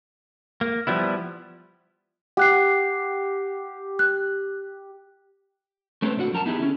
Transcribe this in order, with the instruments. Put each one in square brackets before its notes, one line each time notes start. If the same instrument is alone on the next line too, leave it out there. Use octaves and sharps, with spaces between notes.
[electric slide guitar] A#3
F3 G3 B3 E4
[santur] G4 [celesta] F#5 F#6 C7
[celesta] F#6
[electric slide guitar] A3 C4 C#4 A4 B4 C5
A#2 D3 C4 F#4 F#5
F#2 F3 A#4 G#5 A5
B3 D#4 E4 G4 G#4
D3 C#4